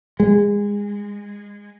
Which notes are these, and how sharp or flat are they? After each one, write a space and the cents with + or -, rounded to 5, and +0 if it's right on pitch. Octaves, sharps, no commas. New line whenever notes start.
G#3 -25